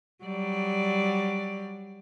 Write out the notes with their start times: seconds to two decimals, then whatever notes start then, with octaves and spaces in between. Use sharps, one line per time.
0.25 F#3 G3 D5